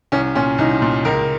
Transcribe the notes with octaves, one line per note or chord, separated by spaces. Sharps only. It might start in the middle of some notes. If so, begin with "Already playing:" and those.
C2 C#4
A#2 C#4
C2 D#4
A#2
C#2 A#4